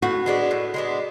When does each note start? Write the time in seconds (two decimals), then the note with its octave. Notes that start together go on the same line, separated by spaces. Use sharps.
0.02 A2 F#4
0.26 G#3 B3 D4
0.51 A2
0.74 G#3 B3 D4